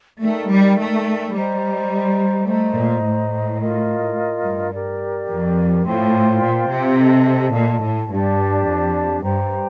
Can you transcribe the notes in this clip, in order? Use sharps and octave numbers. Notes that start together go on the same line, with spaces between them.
A3 D#4 A#4 D5 G5
G3
A3
G3 C5 D#5 A#5
A3 C5 D#5 A#5
A#2
A2
F4 A#4 D#5
G2
G4 A#4 D5
F2
A2 F4 C5 G5 C6
A#2
C3
A4 D#5 A5
A#2
A2
G2 D4 G4 D5 A5
F2
G2 G4 C5 G5 A#5